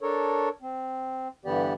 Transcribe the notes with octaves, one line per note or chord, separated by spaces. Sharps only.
D4 A4 A#4 C#5
C4
G2 D3 E3 B3 G4 D5